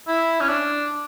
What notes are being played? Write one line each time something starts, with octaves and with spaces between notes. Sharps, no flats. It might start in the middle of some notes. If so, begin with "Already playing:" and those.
E4
C#4
D4